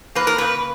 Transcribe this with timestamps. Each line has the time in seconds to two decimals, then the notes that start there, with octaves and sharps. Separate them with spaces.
0.15 A#3 B4
0.27 A#4
0.38 C#3 B4